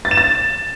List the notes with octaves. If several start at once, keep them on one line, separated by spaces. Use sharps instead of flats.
A6
E7
A6